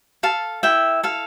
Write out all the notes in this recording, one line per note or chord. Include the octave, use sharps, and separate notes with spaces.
A4 F5 A5
E4 E5 G5
A4 F5